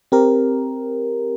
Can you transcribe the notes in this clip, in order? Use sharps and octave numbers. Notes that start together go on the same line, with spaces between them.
C4 G4 A#4